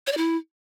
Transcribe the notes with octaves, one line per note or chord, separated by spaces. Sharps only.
C#5
D5
E4